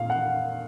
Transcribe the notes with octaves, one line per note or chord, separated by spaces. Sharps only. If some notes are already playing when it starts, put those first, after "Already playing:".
Already playing: A#2 F5
F#5